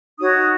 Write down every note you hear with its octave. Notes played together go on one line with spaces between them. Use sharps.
D#4 F#4 C#5 D#6